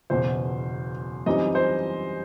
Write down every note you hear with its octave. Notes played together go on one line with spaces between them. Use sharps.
F#1 E2 B2 C5
F#2 E3 G3 C4 D#4 D#5
C5